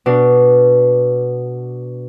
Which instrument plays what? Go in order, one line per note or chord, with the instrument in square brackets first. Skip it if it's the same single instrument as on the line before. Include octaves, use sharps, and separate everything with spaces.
[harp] B2 D4